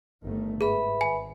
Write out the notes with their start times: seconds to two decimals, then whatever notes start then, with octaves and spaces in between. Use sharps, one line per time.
0.23 G1 D#3 A3
0.61 G#2 G#4 B4 E5 B5
1.01 G#1 G#5